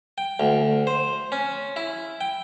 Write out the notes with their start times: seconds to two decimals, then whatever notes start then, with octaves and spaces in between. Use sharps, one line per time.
0.18 G5
0.40 D2
0.87 C5
1.32 C#4
1.76 E4
2.21 G5